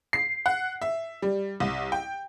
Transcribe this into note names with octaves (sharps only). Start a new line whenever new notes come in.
C7
F#5
E5
G3
C2
G5